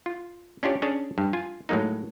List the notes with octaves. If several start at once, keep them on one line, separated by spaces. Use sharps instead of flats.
F4
C#4 D4 F4 G4 C#5
C#4 D4 G#4 C#5 A5
G2
F4 G#5
A2 F#3 G#3 A#3 D#4